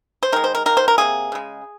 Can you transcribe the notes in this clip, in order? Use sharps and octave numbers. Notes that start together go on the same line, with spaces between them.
C5
D#3 G#3 A#4
C5
A#4
D#3 A#3 A#4
C5
A#4
C3 D#3 A#3 G#4
C#3 G#3